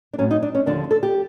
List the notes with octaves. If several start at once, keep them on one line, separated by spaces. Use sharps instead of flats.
D4
A2 F#3 C#4
D#4
D4
C#4
D#2 D3 F3 D4
A4
G4